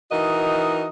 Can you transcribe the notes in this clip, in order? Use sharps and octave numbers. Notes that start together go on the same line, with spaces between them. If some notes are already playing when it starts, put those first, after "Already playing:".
E3 D#4 F#4 A#4 D#5